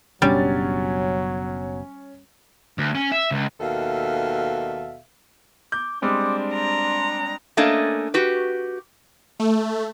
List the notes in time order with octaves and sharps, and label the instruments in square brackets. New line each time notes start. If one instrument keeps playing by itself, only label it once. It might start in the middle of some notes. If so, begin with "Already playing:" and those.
[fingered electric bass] F#1 B2 D4 [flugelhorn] F#3 [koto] G3 [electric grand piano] C#4 A6
[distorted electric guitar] D2
C#4
E5
C#2
[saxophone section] D#2 B2 A4 E5 F5
[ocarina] D6 [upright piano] G6
[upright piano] G3 G#3 C4 [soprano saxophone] D4 [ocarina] D6
[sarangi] A#5 [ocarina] C6
[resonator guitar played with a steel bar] A3 A#3 C#4 D4 D#5
F#4 G4 B4
[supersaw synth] A3